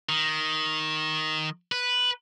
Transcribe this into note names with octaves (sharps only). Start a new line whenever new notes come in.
D#3
B4